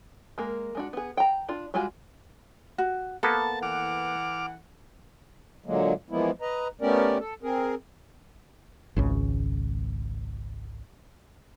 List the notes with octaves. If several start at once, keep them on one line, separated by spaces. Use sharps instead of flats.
G#3 A#3 A#4
G#3 D4 F#4
B3 G#4
G5 A#5
D4 F4
G3 G#3 F4 F#4 G#5
F#4
A#3 B3 A4 A5
E3 F#5 D6 F6
A#2 D3 F#3 G#3 A#3
E3 F3 G#3 A#3 B3 E4
B4 D#5 A#5
A3 B3 C#4 G4 A#4 D5
A4
C4 G#4 A#4
G#1 C#2 C#3